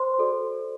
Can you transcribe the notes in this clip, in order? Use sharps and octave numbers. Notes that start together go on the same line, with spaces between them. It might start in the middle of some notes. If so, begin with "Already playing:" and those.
Already playing: C5 C6
F#4 A4 D5